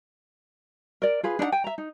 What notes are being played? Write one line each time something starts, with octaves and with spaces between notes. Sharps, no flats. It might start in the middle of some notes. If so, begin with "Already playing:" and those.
A#4 D5
F4 G#4 B4 B5
D4 D#4 A#4 F#5
G5 G#5
E5 A#5
D#4